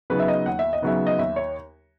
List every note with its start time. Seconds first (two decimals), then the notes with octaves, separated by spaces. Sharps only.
0.10 C#3 F#3 B3 D#4 B4
0.19 E5
0.28 D#5
0.46 D#2 F#5
0.59 E5
0.73 D#5
0.82 C#3 F#3 B3 D#4 E5
1.07 D#5
1.18 D#2 E5
1.36 C#5